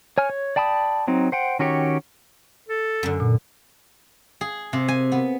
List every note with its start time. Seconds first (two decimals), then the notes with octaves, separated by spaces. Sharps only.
0.18 C#5 G#5 F6
0.30 C#5
0.56 D5 G5 A5 B5 D#6
1.08 F#3 C4 D#4
1.32 C5 F#5 G5
1.59 D#3 C#4 F#4 G4 C#5
2.69 A4
3.03 F#2 D3
3.20 A#2
4.41 G#4
4.73 C3
4.88 G#5
5.12 B3